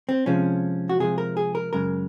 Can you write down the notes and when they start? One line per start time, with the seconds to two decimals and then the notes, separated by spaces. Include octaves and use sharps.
0.09 C4
0.26 C3 F3 G#3 C#4
0.89 F#4
1.00 C3 F3 G#3 G#4
1.18 A#4
1.37 G#4
1.55 A#4
1.73 F#2 C#3 G#3 A#4